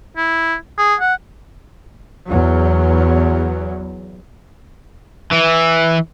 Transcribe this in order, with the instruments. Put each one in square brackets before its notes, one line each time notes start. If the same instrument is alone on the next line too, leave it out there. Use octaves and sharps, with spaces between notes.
[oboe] E4
G#4
F#5
[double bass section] E2 F#3
[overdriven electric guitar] E3